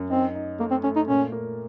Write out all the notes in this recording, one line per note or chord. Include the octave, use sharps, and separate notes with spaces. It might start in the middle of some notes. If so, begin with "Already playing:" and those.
Already playing: F#2
C4 D#4
D#4
A3 A#3
C4
A3 C#4
D#4
A#2 C#4
A#3